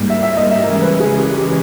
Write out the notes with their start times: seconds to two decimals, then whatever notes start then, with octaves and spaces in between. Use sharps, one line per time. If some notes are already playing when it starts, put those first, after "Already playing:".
Already playing: G#2 G3 A#3
0.10 E5
0.23 E5
0.37 D#5
0.51 E5
0.64 C#3 E3 G#3 C#4 A#4
0.82 B4
1.00 G#4
1.18 G4
1.37 G4